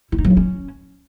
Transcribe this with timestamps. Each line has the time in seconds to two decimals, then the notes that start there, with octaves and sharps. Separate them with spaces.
0.12 E4
0.18 D#4
0.24 F#3
0.31 D#4
0.37 C#4